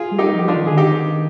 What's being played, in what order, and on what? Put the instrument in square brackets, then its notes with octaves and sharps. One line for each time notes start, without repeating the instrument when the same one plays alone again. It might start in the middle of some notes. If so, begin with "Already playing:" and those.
Already playing: [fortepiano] F4 G#4
[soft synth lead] G3
[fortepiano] D#4 G4
[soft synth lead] F3
[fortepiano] G4
D4 F4
[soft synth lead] D#3
[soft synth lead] D3 [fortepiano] G#4
[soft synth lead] D#3 [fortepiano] D#4 G4